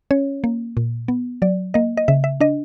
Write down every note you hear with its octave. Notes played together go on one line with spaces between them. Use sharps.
C#4 C#5
A#3
A#2
B3
F#3 D5
A#3 D#5
D#5
C#3 E5
E5
D4 D#5